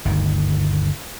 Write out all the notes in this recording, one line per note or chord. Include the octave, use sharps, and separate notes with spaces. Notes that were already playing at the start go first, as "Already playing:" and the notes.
G1 D2 D#3